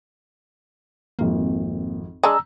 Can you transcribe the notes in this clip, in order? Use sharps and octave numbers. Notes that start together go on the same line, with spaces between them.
G#1 F2 A#3
G#3 D4 A#5 E6